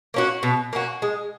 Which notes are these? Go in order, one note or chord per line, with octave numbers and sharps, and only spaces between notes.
A#3 C#4 F#4
B2
A#3 C#4 F#4
G#3